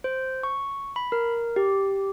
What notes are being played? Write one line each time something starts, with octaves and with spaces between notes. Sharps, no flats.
C5
C#6
B5
A#4
G4